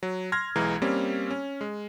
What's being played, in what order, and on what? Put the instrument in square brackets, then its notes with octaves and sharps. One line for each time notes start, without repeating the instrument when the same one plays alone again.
[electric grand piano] F#3
C6 F6 G#6 A#6
B1 E3 G#3 A#5
G3 A#3 C4 C#4
C#4
G#3